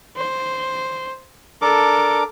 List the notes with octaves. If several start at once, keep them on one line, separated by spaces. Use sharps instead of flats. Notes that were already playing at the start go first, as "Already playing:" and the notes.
C5
D4 A4 A#4 D6